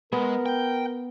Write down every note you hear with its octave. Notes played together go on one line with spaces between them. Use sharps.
G#3 B3 A#4
G5